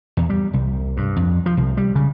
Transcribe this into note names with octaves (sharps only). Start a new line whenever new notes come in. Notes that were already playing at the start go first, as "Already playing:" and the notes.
E2
G3
C2
G2
F2
F3
C2
G3
C#3